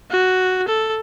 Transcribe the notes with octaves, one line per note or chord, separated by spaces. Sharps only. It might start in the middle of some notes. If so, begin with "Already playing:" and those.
F#4
A4